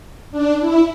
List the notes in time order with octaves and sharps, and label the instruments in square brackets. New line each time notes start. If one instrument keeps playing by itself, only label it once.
[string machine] D4
E4